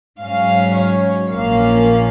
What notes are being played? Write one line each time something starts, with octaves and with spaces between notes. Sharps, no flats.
G#2 F#3 C#4 F5
C#5
A#1 A#2 F3 A#3 C#4 F5